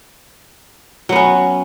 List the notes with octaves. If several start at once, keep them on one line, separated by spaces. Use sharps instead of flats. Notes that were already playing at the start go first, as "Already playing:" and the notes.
F#3 B3 C#4